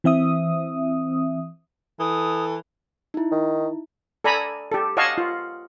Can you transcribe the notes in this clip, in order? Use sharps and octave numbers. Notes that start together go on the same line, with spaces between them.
E3 C4 E5 D#6
E3 A4 D#6
D#4 E4
D#3
A4 D5 G#5 A#5 B5
G4 A4
C#5 D#5 F5 F#5 A5 C#6
F4